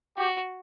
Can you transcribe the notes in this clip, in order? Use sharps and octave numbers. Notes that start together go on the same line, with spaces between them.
F#4 G4